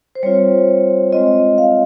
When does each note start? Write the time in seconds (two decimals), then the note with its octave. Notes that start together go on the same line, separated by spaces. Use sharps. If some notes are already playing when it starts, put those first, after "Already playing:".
0.15 C5
0.23 G3 C4 F4 C#5
1.13 G#3 C4 F4 D#5
1.58 F5